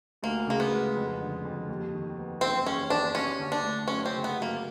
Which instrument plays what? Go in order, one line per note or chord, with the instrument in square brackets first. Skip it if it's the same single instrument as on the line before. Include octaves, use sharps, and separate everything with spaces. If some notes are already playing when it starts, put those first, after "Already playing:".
[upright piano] D2 [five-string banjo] A#3
[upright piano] C#3 [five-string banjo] A#3
[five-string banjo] B3
[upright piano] G#3
F2
D3
F2
D#2
D#3
B3
[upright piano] F#1 [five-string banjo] C4
[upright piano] E2 [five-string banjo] C#4
[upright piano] D#3 [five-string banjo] D4
[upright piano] D#2 [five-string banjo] C#4
[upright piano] D3
[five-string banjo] D4
[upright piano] A3
[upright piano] F#2 [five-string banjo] C#4
[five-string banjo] C4
[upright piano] C#3
[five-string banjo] B3
[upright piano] F#2
[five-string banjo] A#3